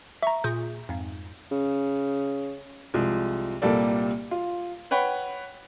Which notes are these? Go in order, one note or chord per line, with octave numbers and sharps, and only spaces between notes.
E5 A#5 C#6
A#2 G#4 G6
F2 G#2
C#3
C2 F3 G#3
C2 A#2 G3 A#3 A4 D5
F4
B4 C#5 F#5 G5 B5